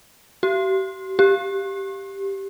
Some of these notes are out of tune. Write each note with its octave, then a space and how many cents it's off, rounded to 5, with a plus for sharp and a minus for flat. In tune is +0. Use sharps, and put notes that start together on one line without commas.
G4 -40
G4 +0